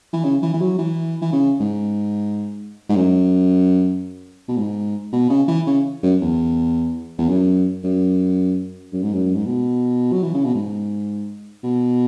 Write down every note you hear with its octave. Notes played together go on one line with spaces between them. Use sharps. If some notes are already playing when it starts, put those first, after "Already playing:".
E3
C#3
E3
E3
F#3
E3
E3
C#3
G#2
G#2
F#2
B2
G#2
B2
C#3
E3
C#3
F#2
E2
E2
F#2
F#2
F#2
G#2
F#2
G#2
B2
F#3
E3
C#3
B2
G#2
B2